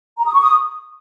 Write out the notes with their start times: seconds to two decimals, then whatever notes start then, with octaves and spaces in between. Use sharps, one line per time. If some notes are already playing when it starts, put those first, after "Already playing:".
0.18 A#5
0.26 D#6
0.33 C#6
0.41 D#6